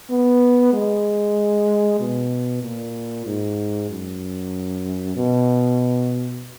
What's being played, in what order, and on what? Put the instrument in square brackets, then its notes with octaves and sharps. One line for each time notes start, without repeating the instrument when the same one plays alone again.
[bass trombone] B3
G#3
B2
A#2
G#2
F#2
B2